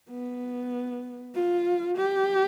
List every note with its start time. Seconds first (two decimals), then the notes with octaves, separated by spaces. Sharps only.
0.11 B3
1.35 F4
1.98 G4